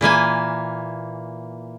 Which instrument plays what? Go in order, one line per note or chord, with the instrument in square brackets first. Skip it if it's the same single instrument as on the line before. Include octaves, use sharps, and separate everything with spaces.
[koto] A#2 E3 A#3 G#5